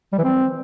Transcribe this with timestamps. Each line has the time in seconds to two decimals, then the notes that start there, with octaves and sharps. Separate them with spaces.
0.12 G3
0.18 E3
0.24 C4